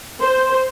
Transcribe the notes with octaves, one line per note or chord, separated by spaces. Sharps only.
C5